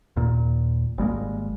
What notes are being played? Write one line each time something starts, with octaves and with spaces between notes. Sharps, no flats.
D#2 A#2
G#1 G3 G#3 A#3